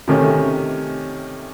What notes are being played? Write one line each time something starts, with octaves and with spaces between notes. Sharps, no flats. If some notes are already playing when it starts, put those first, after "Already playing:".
C3 D#3 A3 C#4